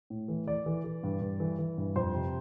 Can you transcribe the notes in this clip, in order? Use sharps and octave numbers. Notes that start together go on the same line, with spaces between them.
A2
E3
E3 D5
E3
E3
G2
G2
E3
E3
G2
F2 C5
C3